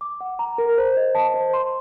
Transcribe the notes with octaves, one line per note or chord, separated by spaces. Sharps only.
D6
F#5
A#5
A#4
C5
D#5
A5
C5
C6